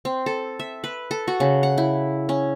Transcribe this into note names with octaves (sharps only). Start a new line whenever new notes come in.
C4
A4
E5
B4
A4
F#4
C#3
F#5
E4
C#4